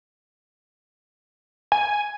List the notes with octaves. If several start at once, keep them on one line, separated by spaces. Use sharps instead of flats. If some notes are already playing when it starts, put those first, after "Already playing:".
G#5